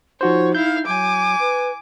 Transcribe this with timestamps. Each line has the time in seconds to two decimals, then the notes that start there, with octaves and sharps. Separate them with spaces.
0.21 F3 D#4 F#4 C5 C#5
0.55 E4 F5 G6
0.86 F#3 G#5 D6
1.39 B4